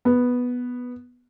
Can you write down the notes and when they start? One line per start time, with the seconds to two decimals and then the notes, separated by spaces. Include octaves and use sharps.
0.05 B3